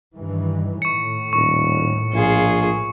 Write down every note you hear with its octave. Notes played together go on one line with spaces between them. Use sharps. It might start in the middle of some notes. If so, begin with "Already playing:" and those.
G2 D#3 E3
A2 C#6 C#7
D#1 C#6
A#1 F4 G#4